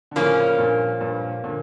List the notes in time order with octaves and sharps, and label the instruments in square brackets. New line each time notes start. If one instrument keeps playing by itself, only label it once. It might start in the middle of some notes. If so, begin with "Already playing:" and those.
[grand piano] D3
[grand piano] A2 C#3 [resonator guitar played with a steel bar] F3 A#3 C#4
[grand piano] G2 A#2
G2 A#2
A#2 D3